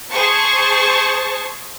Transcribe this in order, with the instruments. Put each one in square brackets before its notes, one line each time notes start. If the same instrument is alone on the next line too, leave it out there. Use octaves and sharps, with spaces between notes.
[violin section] G#4 C5 A5 C#6